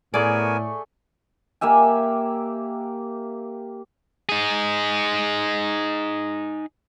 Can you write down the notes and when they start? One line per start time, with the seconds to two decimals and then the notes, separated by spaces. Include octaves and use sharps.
0.14 A2 A3 B3 G#4 A#4 D5 G#5
1.61 A#3 G4 E5 G#5
4.29 D#4 G#4